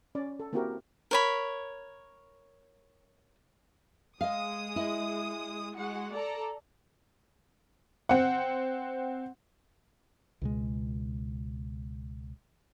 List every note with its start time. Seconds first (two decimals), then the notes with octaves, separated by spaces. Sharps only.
0.15 C#4 D5
0.40 A4
0.53 A#3 C4 E4 F#4 G4 A#4
1.11 A#4 C#5 B5
4.21 G#3 D#5 F5 D#6
4.76 E4 D#5
5.76 G#3 F#4 F#5
6.15 A4 D5 A#5
8.09 C4 F#5
10.42 C#2 B2 G#3